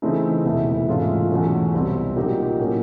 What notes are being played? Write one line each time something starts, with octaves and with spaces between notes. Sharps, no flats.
C#3 E3 A3 C4 D#4
E1 E2 C3 E3 A3
G#2 E3 A3 C#4 F4
E2 B2 F#3 A3 C#4
C2 B2 G3 C4
A#2 F#3 A#3 D#4 G4
A2 F#3 A#3 C#4